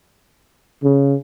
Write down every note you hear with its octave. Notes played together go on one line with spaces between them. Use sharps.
C#3